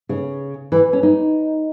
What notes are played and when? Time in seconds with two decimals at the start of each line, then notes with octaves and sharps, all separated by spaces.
0.09 C#3
0.72 E3
0.93 C#4
1.03 D#4